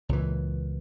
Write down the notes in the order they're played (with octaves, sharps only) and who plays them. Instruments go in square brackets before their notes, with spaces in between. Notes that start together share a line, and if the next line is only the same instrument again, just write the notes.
[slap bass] C#2 A#2 E3